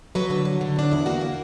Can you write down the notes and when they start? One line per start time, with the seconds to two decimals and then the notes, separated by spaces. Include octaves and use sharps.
0.15 F#3 B4
0.30 D3 B4
0.45 F#3
0.61 D3
0.76 E2 D4
0.91 E2 E4
1.06 A#3 F#4
1.21 A#3